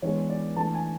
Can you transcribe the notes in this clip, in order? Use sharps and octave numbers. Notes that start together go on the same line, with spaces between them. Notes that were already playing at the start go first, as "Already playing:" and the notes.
E3 G#3 B3 D4 C#5
D5
E3 A3 D4 A5
G#5